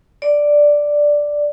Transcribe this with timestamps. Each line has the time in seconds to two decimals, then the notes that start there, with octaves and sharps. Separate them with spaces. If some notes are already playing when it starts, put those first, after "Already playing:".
0.22 D5